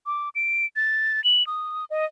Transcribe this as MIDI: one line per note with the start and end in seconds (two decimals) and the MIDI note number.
0.06 0.29 86
0.35 0.66 98
0.76 1.23 93
1.24 1.45 102
1.47 1.85 87
1.90 2.05 75